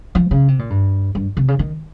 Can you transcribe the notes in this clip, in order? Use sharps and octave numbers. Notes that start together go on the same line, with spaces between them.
F3
C#3
C3
A#2
G2
G2
C3
C#3
D#3